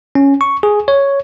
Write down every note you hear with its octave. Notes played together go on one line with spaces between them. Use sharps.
C#4
C#6
G#4
C#5